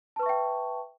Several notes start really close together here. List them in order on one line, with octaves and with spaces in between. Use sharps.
A5 B4 C#6 E5 G5